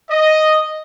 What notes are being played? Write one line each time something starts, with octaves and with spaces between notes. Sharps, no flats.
D#5